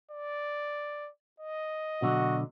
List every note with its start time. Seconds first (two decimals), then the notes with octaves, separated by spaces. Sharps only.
0.11 D5
1.40 D#5
2.02 B2 D3 F#3 F#4